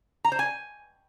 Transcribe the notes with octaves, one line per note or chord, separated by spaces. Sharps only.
A#5
C5
G#5